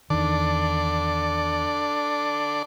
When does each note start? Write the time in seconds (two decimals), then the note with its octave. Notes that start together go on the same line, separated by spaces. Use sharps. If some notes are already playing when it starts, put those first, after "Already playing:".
0.10 E2 D#3 D4 A4 D5